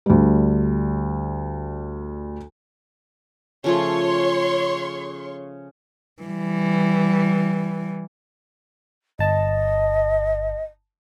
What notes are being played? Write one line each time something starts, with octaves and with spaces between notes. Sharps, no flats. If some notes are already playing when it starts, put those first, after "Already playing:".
D2 G3
C#3 F3 A3 C#5 C6 C#6
E3 G3
G1 D#5 A5